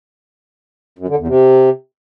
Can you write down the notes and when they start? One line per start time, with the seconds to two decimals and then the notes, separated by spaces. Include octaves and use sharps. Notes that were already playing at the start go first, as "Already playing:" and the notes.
0.99 F#2
1.08 D3
1.18 E2
1.28 C3